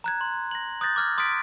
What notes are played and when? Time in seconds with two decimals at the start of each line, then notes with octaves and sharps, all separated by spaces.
0.04 A#5 F#6 G#6
0.21 C6
0.51 A#6 F#7
0.81 D#6 F#6 G6 A6 A#6
0.96 D6 F6 G#6
1.18 C6 D#6 F6 A6 B6 D7